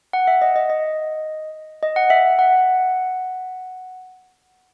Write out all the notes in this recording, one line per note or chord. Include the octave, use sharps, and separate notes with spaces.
F#5
E5
D#5
D#5
D#5
D#5
F#5
E5
F#5